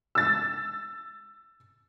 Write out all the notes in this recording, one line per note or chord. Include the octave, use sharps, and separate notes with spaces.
E6 A6